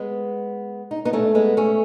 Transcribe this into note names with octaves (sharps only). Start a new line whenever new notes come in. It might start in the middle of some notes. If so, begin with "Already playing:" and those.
Already playing: G#3 B3
D#4
B3 D#4
A3 C#4
G#3 B3
A3 C#4